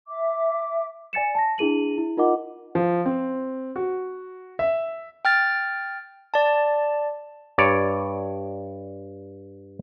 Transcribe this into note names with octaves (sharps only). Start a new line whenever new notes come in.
E5 D6
D5 G#5 A6 C#7 E7
A5 A#6
D4 E4 G#4 D#7 F#7
E4
D#4 F4 A#4 D#5 F#5 D6
F3
C4
F#4
E5
G5 F6 A6
D5 A5
G2 C#5 D5